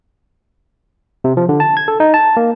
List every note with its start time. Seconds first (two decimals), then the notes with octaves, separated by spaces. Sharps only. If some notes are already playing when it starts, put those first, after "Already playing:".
1.24 C3
1.37 F3
1.49 D3
1.60 A5
1.77 G#6
1.88 A4
2.00 D#4
2.14 A5
2.37 A#3